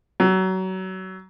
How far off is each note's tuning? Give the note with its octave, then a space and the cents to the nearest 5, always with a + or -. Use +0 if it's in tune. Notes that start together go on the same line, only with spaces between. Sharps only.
F#3 +25